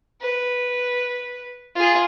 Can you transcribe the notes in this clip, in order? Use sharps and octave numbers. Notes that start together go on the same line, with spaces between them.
B4
F4 G#4